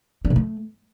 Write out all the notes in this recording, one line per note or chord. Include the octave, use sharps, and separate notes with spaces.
D4
B2
A3